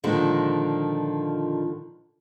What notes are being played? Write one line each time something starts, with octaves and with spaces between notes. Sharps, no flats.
A#2 D3 D#3 F3 G#3